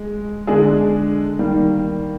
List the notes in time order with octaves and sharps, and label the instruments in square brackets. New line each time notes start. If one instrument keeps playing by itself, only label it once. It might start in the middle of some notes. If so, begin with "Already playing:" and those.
Already playing: [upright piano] G#3
D3 G#3 D4 G#4
D#3 G3 A#3